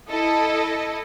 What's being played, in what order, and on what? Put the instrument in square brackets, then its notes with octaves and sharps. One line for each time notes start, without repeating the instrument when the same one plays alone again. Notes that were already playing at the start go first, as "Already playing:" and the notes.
[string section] E4 A4 D#5